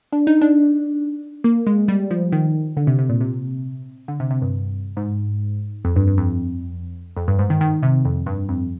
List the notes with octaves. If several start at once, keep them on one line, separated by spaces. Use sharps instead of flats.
D4
D#4
D4
A#3
G#3
G3
F3
D#3
D3
C3
C3
A#2
C3
D3
C3
C3
G2
G#2
F2
G2
G2
F2
F2
G2
G#2
D#3
D#3
C3
F2
G2
F2